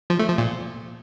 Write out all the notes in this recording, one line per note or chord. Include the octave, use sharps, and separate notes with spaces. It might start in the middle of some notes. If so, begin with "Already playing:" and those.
F3
A3
F3
A#2